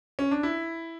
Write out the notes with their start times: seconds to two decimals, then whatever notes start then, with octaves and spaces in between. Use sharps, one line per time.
0.19 C#4
0.31 D4
0.43 E4